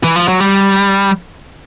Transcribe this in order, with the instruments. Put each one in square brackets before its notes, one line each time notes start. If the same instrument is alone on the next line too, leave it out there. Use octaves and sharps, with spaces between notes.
[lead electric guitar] E3
F3
F#3
G3